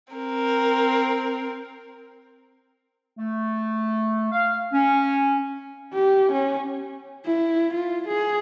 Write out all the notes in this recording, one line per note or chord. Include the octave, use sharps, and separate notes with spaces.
C4 A#4
A3
F5
C#4
G4
C#4
E4
F4
G#4